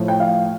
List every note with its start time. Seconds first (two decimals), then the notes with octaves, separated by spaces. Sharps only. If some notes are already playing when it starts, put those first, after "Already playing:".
Already playing: A2 F3
0.08 G5
0.20 F5